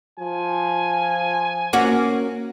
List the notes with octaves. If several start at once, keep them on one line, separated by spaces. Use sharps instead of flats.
F3 G#5
A#3 C#4 F#4